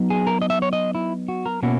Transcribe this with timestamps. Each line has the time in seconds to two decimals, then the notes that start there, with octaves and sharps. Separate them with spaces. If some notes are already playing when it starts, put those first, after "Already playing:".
Already playing: F#3 B3 D#4
0.10 G#4
0.27 A#4
0.42 D#5
0.50 E5
0.62 C#5
0.73 D#5
0.95 E4
1.28 F#4
1.46 A#4
1.63 B2 A#3 C#4 E4 F#4